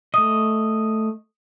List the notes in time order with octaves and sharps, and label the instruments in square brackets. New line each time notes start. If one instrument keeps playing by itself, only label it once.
[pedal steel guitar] A3 D#5 [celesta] D#6